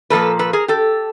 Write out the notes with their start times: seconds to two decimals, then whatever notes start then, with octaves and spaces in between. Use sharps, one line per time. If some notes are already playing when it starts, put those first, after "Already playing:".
0.10 A#2 F3 A#3 A4 B4
0.39 A4 B4
0.53 G#4 A#4
0.68 G4 A4